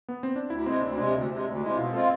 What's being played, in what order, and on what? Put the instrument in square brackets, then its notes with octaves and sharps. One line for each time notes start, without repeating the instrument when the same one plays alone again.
[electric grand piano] B3
C4
D4
[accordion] D2 [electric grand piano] E4
[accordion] C3 G#3 [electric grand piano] C4
[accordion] D2 [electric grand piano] D4
[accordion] C3 G#3 [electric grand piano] D4
[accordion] D2
C3 G#3
D2
[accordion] C3 G#3 [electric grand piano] E4
[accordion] B2 [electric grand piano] F4
[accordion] G#3 C4 F4 [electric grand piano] A4